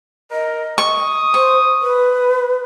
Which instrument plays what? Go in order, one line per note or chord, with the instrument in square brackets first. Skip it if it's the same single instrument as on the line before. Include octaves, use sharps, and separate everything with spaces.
[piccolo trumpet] A#4 [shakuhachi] D#5
[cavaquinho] C#6 [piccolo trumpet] D#6
[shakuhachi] C5 [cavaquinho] C#6
[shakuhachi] B4